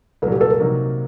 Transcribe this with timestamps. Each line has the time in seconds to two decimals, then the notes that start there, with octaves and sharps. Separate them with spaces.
0.22 C2 A#2 F#3 A4
0.32 G4
0.41 A4
0.50 A#4
0.60 C3 F#3 A#3 D#4 F#4